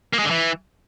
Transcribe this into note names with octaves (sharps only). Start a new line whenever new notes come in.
A#3
G#3
D3
E3